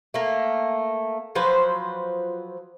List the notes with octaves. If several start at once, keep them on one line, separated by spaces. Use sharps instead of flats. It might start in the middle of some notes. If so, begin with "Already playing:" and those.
A3 A#3
F3 F#3 B4 C5